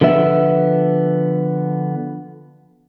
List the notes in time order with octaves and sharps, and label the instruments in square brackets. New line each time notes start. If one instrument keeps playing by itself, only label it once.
[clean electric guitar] D3 F3 B3 E5